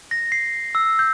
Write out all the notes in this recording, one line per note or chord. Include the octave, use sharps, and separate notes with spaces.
A#6
C7
E6
G6